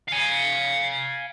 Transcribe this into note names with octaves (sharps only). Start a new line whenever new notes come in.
F5 G#5